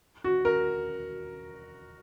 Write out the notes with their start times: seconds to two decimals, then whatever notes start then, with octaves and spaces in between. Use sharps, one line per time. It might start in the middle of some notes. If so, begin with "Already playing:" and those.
0.24 F#4
0.45 A#4